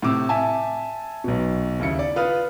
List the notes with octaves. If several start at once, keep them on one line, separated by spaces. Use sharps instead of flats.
A2 C3 C4 D6 E6
E5 G#5 A5
B1 B2
D#2 C#3 E4 C#7
D5
F4 B4 F5 D#6 F6